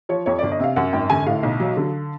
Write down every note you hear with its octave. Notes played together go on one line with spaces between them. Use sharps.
F3 C#5
F2 C#5
D5
G1
D#5
C3 F5
F#2 F#5
G#1 G5
D3 G#5
A2 F5
B1
F#3
D3